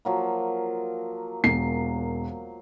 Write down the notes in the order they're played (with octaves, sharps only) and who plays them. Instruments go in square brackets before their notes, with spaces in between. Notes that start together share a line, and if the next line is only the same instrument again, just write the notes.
[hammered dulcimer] F3 F#3 A#3
[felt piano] E1 C7